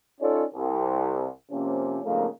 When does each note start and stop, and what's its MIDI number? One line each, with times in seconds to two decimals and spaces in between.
0.21 0.44 61
0.21 0.44 63
0.21 0.44 65
0.21 0.44 69
0.21 0.44 73
0.21 0.44 74
0.53 1.27 36
1.51 1.99 48
1.51 1.99 53
1.51 1.99 58
1.51 1.99 61
2.04 2.27 41
2.04 2.27 44
2.04 2.27 49
2.04 2.27 57
2.04 2.27 58